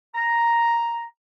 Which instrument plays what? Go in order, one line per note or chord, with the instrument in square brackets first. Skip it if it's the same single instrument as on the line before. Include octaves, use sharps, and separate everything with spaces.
[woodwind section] A#5